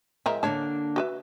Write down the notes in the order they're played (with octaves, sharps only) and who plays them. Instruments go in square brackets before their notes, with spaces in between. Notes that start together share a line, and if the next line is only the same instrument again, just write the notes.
[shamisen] F3 G#3 A#4 [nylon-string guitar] E5
[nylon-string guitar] D3 A#3 D4 [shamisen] C#5 A5
[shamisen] F#4 B4 E5